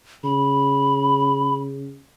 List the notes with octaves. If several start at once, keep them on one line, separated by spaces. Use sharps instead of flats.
C#3 B5